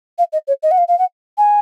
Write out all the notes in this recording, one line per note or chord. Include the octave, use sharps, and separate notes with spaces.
F5
D#5
C#5
D#5
F#5
F5
F5
F#5
G#5